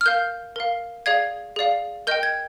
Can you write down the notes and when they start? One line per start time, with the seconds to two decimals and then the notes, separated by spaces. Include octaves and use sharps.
0.01 F6
0.06 A#4 F5 G6
0.56 A#4 F5
1.06 G#4 D5 F5 G#6
1.56 G#4 D5 F5
2.07 A#4 D#5 G5 G6
2.23 G#6